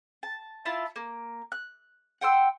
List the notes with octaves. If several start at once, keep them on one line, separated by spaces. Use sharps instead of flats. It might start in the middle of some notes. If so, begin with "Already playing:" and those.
A5
E4 F4 A5
A#3
F#6
F#5 G5 C6 E6